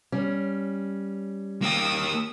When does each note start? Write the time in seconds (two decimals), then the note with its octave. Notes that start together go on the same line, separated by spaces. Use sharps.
0.12 G3 C#4
1.62 A#3 G4 D#6 E6